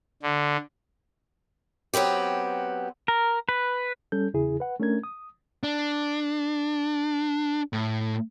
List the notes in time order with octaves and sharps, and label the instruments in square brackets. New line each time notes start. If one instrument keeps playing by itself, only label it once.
[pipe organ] D3
[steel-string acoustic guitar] F#3 B3 C4 G4
[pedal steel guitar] A#4
B4
[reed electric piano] G3 C#4 A4 G6
E2 C#3 E4 G#4
B4 F#5
A3 C#4 D4 A#4 G#6
D#6
[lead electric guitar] D4
A2